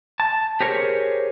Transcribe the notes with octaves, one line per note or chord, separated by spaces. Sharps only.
A5
G4 G#4 A#4 C5 C#5